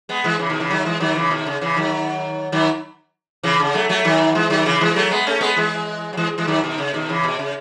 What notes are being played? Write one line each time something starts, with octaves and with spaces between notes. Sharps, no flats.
G#3 B3
E3 G#3
C#3 E3
B2 D#3
C#3 E3
D#3 F#3
E3 G#3
D#3 F#3
C#3 E3
B2 D#3
C#3
C#3 E3
D#3 F#3
D#3 F#3
C#3 E3
C#3
F#3 A3
F#3 A3
D#3 F#3
E3 G#3
D#3 F#3
C#3 E3
E3 G#3
F#3 A3
G#3 B3
A3 C#4
G#3 B3
E3 G#3
F#3
E3 G#3
E3 G#3
D#3 F#3
B2 D#3
C#3
B2 D#3
C#3 E3
B2
C#3